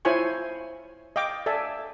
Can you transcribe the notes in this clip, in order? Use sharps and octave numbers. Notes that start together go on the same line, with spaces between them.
E4 F4 C5 C#5 G#5 C#6
D#5 F5 G5 D6
A4 D5 E5 G#5